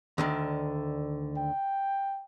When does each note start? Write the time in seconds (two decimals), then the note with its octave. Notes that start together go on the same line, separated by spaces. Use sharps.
0.18 D2 D3 D#3
1.37 G5